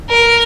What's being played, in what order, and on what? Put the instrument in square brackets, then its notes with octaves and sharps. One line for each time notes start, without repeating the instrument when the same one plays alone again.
[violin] A#4